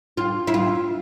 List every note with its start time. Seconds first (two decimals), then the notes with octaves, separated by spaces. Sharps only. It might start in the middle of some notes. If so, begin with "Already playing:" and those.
0.17 F4
0.47 E4
0.54 F4